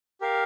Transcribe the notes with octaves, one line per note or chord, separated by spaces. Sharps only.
G4 A#4 F5